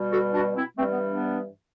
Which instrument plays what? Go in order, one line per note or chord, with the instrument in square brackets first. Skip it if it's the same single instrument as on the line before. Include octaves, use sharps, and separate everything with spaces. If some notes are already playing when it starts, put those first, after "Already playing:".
Already playing: [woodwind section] B2 G3
F#4 A4
D4 F#4
C4 E4
G2 E3 G3 A3 C4
B3
B3 D4